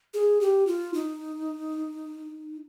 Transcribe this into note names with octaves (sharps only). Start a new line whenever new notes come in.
G#4
G4
F4
D#4